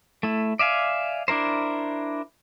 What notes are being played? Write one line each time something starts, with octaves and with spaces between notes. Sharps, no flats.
A3 E4
D5 E5 F5 G#5
D4 E4 A#4 C5